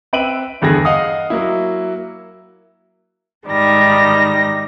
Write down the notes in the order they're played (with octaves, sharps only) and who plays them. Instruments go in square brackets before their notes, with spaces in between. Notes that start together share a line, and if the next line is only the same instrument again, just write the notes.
[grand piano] C4 B4 E5 D7 D#7 F#7
E2 G2 D3 G#4 A#6
D#5 F5 F#5 D#6
F#3 A#3 E4
[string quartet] G#2 D#3 G3 A#6